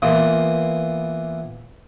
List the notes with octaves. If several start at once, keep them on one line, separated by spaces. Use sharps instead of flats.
E3 A#3 B3 F4